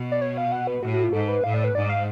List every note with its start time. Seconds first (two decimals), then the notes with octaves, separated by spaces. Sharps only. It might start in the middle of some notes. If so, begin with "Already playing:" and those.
Already playing: B2
0.12 D5
0.21 C#5
0.38 F5
0.52 F#5
0.67 B4
0.83 A2 F#4
0.94 F#4
1.03 F4
1.13 G#2 A4
1.28 B4
1.44 A2 F5
1.54 D5
1.64 B4
1.75 G#2 D5
1.89 F5